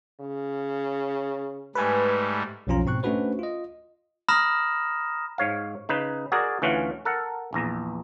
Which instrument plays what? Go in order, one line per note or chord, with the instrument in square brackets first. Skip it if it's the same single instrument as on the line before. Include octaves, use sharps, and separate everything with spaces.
[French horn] C#3
[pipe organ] G#2 G3 A3 [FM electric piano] B4 G#5
[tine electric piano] B1 F2 F3 C#4 F4 A#5
G#2 B2 C4 C#6 F#6
A3 C#4 D4 F#4 B4 C5
F4 D#5
[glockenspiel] A#5 B5 D#6 F6 A#6 E7
[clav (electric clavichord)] G#2 C#5 F5
C#3 D#4 B4
F#4 G#4 A#4 D5
D2 E3 C#4 F4 F#5
A4 A#4 F#5
A#1 E2 A#5